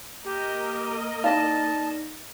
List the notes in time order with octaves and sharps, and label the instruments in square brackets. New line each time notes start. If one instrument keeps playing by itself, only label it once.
[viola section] A#3 A#4 D#5 [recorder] G4
[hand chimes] D#4 D5 A#6 [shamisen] E4 G4 F5 [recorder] A5